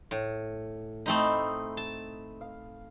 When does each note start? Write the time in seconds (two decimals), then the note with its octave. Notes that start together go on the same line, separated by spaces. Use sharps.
0.11 A2
1.06 A3 C4 D#4 D#5 E5 B5
1.77 A5
2.41 F5